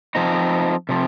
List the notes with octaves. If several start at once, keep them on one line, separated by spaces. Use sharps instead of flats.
F3 C4 D#4
C3 F3